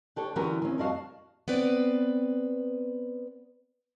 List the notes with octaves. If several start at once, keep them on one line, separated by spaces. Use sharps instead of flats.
D4 G4 A4 C#5
D3 E3 F#3 C#4 G4 A#4
D#3 C4 C#4
F2 G3 F#4 D#5 F5 A5
B3 C4 B4 D5